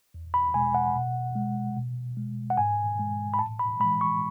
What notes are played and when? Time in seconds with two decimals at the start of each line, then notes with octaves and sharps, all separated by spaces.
0.14 E2
0.34 B5
0.54 B2 G#3 G#5
0.75 F#5
0.95 B2
1.36 G#3
1.77 B2
2.17 G#3
2.50 F#5
2.58 G#2 G#5
2.99 G#3
3.34 B5
3.39 A2 A5
3.59 B5
3.80 G#3 B5
3.84 E3
4.01 C#6